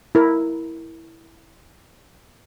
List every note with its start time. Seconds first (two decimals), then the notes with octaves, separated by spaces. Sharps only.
0.15 E4 A#4